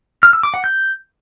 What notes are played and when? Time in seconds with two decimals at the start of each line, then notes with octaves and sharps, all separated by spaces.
0.23 F6
0.33 E6
0.43 D6
0.54 F#5
0.64 G6